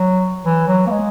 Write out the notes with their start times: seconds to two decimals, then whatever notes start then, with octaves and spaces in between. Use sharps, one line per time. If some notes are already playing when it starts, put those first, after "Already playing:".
Already playing: F#3
0.45 E3
0.68 F#3
0.87 A#3
0.90 G#3